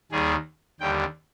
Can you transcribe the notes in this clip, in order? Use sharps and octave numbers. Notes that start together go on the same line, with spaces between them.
D#2 D#3 G3 G#4
D#2 D3 G3 G5